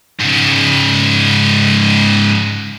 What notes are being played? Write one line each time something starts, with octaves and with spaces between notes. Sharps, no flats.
G#2 C#3